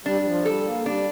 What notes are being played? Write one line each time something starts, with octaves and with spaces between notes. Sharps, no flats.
G3 D4
G3
F3
G3 A4
A#3
G3 D4